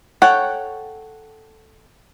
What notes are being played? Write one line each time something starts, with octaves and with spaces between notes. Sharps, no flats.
A4 C#5 F#5 G5